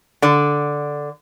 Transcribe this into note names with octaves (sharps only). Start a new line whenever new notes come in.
D3 D5